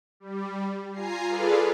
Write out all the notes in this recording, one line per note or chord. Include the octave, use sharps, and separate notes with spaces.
G3
F4 G#5 A#5 C7
F4 G#4 A4 B4 D5 F5